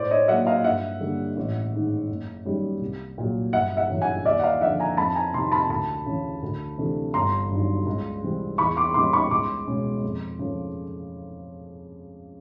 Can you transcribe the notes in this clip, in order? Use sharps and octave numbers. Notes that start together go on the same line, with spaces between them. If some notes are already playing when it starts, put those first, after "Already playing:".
Already playing: A2 C5 D5
C#5 D#5
F#3 A#3 E5 F#5
D#5 F5
G2 E5 F#5
D3 G3 A#3
A1
G#2 D#3
F#1
F#2 D#3 G3
C2
A#2 F#3
G1 E5 F#5
E5 F#5
F#2 C#3 E3
F#5 G#5
D#2 D5 E5
F#5
D#5 F5
D3 F3 E5 F#5
G#5 A#5
F2 A5 B5
G#5 A#5
C3 D#3 A#5 C6
A5 B5
D2 A5 B5
C#3 E3
D2
C3 E3 A3 D4
G1 A#5 C6
G2 D#3 F#3
C#2
C3 E3 G3 C4
E2 B5 C#6
C6 D6
C#3 E3 G3 B3 C6 D6
B5 C#6
C#2 C6 D6
B2 G#3 C#4
F2
C#3 F3 A3